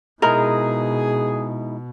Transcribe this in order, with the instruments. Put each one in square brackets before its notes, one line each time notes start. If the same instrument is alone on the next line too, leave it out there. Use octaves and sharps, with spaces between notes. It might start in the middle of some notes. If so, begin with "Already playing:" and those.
[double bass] B2 [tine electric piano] G#3 D#4 E4 [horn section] G#4 [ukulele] A#4